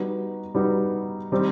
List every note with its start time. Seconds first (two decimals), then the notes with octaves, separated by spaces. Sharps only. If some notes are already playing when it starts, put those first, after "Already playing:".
Already playing: G3 B3 D#4 F#4
0.55 G3 B3 D#4 F#4
1.32 D#3 G3 C4 D#4